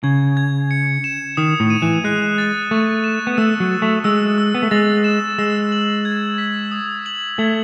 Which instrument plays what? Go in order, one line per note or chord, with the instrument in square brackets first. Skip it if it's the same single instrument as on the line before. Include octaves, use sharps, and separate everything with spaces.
[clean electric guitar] C#3 [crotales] G#6
[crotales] G#6
C#7
E7
[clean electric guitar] D#3 [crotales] D#6
[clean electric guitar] A2
[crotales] D#7
[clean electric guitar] E3
[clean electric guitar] G#3 [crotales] F#6
[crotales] A6
[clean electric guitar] A3 [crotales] C#6
[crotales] E7
[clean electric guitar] B3
[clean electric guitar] A3 [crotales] E6
[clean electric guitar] F#3
[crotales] A6
[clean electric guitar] A3
[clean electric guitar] G#3 [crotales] E6
[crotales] E6
[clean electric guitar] B3
A3
[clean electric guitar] G#3 [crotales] A6
[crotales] E7
[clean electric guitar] G#3 [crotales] E6
[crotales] F#7
G#6
B6
D#6
F#7
[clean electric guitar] A3 [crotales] G#6